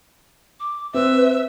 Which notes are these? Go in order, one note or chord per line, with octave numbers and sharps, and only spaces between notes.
D6
C4 B4 E5